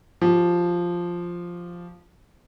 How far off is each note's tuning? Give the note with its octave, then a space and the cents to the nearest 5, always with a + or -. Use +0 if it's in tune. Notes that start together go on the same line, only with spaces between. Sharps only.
F3 +0 G4 -20